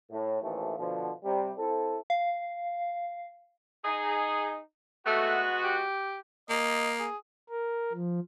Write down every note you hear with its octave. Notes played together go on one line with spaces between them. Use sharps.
A2
A1 D#2 E3 F3 A3
B2 D3 F3
C3 G3
C4 E4 A4
F5
D#4 G#4
G#3 A3 B3 F#4
G4
A#3 D#5
G#4
A#4
F3